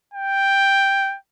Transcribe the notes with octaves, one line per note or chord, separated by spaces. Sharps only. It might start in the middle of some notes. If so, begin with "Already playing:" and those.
G5